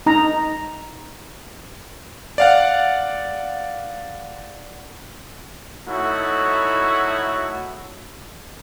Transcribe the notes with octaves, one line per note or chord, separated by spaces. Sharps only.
D#4 A#5
D5 F5 F#5
A3 D#4 E4 F#4 C#5